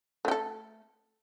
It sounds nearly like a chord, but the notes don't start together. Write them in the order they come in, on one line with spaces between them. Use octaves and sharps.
A3 G4 A4